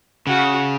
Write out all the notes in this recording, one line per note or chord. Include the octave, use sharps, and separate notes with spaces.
C#3 F#4